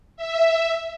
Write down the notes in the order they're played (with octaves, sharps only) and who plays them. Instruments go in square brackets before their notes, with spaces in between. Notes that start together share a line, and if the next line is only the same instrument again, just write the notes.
[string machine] E5